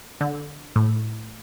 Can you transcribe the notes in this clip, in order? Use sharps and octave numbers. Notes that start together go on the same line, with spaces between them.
D3
A2